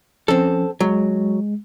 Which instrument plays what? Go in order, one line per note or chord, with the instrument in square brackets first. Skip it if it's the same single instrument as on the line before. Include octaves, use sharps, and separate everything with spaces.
[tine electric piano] F3 C#4 [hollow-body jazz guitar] C4 A4
[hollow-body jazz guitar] F#3 [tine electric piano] G#3